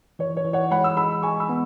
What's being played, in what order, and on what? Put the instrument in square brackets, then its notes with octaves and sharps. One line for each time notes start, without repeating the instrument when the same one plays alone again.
[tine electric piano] E3 [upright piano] C#5
[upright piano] C#5
[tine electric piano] E3
[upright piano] C#5 F#5
[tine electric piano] G#3 [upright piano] F#5 B5
[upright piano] B5 E6
[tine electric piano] G#3 [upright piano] B5 E6
[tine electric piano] G#3 [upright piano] G#5 C#6
[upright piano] B5 E6
[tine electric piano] B3